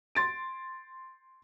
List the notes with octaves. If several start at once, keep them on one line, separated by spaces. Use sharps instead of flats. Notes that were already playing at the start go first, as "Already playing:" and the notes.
C6 A6 D7